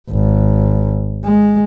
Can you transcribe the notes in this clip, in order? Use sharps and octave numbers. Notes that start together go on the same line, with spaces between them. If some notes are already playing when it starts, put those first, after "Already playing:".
G#1
G#3